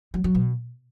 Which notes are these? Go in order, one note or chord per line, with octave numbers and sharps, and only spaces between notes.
F#3
F#3
B2